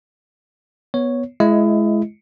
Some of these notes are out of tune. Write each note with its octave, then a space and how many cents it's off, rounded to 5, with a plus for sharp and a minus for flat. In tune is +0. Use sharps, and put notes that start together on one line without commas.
B3 -10 C#5 +0
G#3 +25 E4 +25 D#5 +10